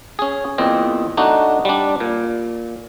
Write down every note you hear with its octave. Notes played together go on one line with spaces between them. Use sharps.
C#4 G#4
E2 A#2 C4 D#5
A3 D4 D#4 F#4
G3 D4
A#2